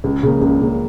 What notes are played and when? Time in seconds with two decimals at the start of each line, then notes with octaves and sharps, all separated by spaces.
0.04 C#2
0.23 C#3 A#3
0.41 C#2
0.62 C#3 A#3